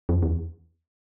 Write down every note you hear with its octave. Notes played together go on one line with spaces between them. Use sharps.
F2
E2